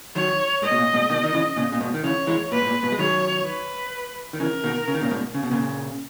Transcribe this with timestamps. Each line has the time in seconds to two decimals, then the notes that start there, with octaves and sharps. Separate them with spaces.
0.15 D#3 F#3 C#5
0.62 G#2 D#5
0.71 B2
0.78 A#2
0.93 G#2 B2
1.10 B2 D#3
1.24 D#3
1.33 C#3 E3
1.56 A#2 C#3
1.72 A#2
1.80 G#2 B2
1.94 D#3
2.04 C#3 E3 C#5
2.27 E3 G#3
2.51 A#2 B4
2.61 G#2
2.67 A#2
2.83 G#2 B2
2.92 G#3
2.99 D#3 F#3 C#5
3.46 B4
4.33 D#3
4.40 C#3 E3 A#4
4.64 B2 D#3
4.88 C#3
4.94 D#3
5.01 A#2 C#3
5.11 G#2 B2
5.35 C#3
5.43 B2
5.51 A#2 C#3